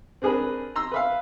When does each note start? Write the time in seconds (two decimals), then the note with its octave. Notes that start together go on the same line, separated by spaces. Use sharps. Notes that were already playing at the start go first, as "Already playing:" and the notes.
0.22 C4 D4 G#4 A#4 B4
0.76 A#5 C6 E6
0.92 B4 E5 F5